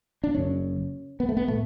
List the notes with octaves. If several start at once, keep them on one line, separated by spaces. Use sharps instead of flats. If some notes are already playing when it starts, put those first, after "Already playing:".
D4
F#1 F#2 C#3 C#4
B3
A3
B3
A2 A3